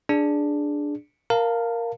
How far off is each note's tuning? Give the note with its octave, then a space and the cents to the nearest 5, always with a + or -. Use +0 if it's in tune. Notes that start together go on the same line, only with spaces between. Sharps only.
D4 +0 G#4 +0 D5 +0
A#4 +0 F5 +0 A5 +25